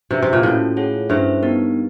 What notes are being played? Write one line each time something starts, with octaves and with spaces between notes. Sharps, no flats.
C3 D4 F#4 B4 E5
C3
A#2
A2 C#4 F#4 A4
F4 G#4 C#5 F#5
G2 C#4 E4 A4 C5 E5
B3 D#4 G4 A#4